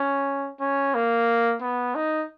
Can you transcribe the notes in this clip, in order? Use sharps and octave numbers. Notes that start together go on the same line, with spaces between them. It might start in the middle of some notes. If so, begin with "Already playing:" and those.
Already playing: C#4
C#4
A#3
B3
D#4